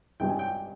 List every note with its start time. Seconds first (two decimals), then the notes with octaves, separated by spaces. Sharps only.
0.20 G#1 G2 G3 G5
0.30 G#5
0.39 G5